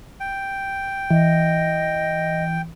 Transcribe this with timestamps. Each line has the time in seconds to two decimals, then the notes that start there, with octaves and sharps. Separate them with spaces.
0.20 G5
1.11 E3 D#5